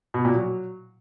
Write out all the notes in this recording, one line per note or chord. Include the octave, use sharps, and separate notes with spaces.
B2
A#2
F#3